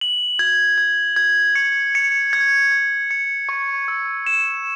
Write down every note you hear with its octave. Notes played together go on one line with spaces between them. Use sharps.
F#7
G#6
G#6
G#6
C#7
C#7
G#6
G#6
C#7
C#6
E6
E7